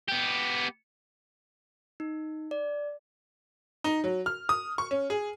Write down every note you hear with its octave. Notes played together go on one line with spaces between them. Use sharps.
B3 G4
D#4
D5
D#4
F#3
F6
D#6
C#6
C#4
G#4